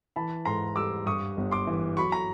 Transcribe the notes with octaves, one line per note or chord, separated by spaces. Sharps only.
E3 A5 B5
G#2 A#5 C6
G3 D6 E6
G2 C#6 D#6
G1
C6 D6
E3
F#3 B5 C#6
A#5